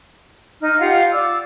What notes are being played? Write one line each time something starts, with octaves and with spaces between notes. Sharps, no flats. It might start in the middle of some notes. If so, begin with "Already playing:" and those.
D#4 F6
F4 G4 F5 F#5
D5 D6 E6